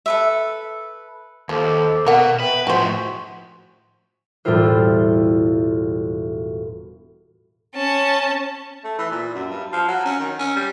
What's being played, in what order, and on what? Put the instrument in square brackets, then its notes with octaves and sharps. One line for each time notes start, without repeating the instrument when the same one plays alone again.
[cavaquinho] A4 B4 E5
[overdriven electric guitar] D#2 [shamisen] F3 [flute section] A4 C5 D6
[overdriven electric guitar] B2 [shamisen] A#4 F#5
[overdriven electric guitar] B4 [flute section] E5 G5
[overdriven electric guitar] A2 F3 [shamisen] F#4 C5 [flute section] G#5 C#6
[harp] E1 A2 G3 E4 F4 C5
[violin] C#4 A5
[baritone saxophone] A3
E3
A#2
F#2
G2
F3
F#3
C#4
D#3
C#4
G3